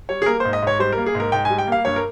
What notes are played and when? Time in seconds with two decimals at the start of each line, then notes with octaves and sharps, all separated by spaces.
0.09 G3 C#5
0.22 G#4
0.26 A#3 A#4
0.40 C5
0.45 G#2
0.53 D#5
0.62 G#2 C#5
0.79 G3 C5
0.92 A#4
0.98 A#3
1.06 G#4
1.15 G#2
1.20 A#4
1.32 G#2 G5
1.45 G#5
1.50 G3
1.58 G5
1.67 A#3 F5
1.85 G2 C#5
1.96 A#4